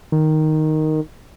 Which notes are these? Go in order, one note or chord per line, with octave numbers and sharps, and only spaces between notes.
D#3